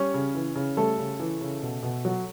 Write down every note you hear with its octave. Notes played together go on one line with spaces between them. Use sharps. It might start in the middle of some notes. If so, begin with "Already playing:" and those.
Already playing: G3 C#4 C#5
C#3
E3
C#3
G3 A3 A4
C#3
E3
C#3
B2
B2
F#3